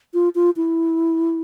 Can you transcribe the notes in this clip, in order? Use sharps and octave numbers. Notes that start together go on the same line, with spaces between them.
F4
F4
E4